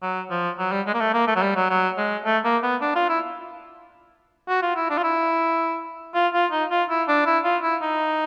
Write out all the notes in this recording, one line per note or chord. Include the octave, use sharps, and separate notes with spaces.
F#3
F3
F#3
G3
G#3
A#3
A3
A#3
A3
F#3
G3
F#3
F#3
G#3
A3
A#3
B3
D4
F4
E4
F#4
F4
E4
D4
F4
E4
F4
F4
D#4
F4
E4
D4
E4
F4
E4
D#4